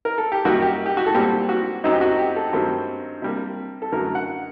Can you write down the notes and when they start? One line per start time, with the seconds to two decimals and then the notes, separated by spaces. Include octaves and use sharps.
0.05 A#4
0.18 A4
0.32 G4
0.45 F#2 D#3 G3 A#3 F#4
0.62 G4
0.86 G4
0.97 F#4
1.06 A4
1.14 A#2 G3 C4 G4
1.49 F#4
1.84 F#2 F#3 C4 D#4
1.92 G4
2.01 F#4
2.19 G4
2.36 A4
2.53 G2 D#3 F#3 A3 C4
3.22 C3 G3 A#3
3.82 A4
3.92 F#2 D3 F#3 A3 A#4
4.15 F#5